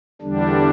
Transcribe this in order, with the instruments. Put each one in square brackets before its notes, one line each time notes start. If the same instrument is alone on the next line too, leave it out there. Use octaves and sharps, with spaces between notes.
[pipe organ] E2 D3 G3 D4